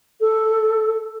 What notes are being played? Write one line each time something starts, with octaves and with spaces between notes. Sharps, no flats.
A4